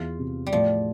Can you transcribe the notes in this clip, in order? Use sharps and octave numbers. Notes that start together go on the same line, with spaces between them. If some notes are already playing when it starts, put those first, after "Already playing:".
Already playing: E2 F4
C3
G3
A2 F3